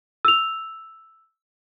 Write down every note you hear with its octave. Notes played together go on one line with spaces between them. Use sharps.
E6 F7